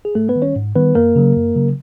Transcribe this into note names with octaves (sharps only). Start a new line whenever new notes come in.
G#4
G#2 A3 A4
B3 B4
D#3 G3
C#4 C#5
G#2
D#3 G3 B3 B4
F#2 A#3 A#4
C#3 F#3
F#2
C#3 F#3